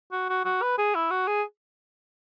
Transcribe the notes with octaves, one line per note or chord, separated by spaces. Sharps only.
F#4
F#4
F#4
B4
G#4
E4
F#4
G#4